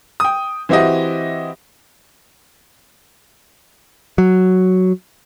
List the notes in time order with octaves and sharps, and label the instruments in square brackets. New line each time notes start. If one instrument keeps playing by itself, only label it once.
[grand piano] G5 D#6
E3 C4 E4 F#4 G4 D#5
[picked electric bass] F#3